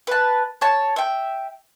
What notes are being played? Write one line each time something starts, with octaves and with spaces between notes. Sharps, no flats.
B4 A5
C#5 A5
E5 G5